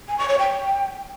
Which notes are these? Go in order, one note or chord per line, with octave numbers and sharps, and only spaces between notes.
G#5
C#6
C#5
G5